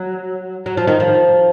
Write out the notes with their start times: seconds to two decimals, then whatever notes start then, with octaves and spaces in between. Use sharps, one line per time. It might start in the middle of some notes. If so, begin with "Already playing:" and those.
Already playing: F#3
0.66 F#3
0.77 F3
0.87 D#3
1.00 F3